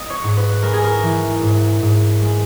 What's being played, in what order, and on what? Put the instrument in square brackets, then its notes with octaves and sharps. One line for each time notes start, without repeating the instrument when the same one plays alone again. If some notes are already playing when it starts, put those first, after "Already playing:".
Already playing: [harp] D#5
C#5
G#2
B4
G#3 A#4
G#4
A#4
E3
G#2
G#2
G#3